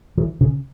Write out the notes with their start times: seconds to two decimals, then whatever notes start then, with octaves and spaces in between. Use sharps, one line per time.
0.18 E3
0.41 C#3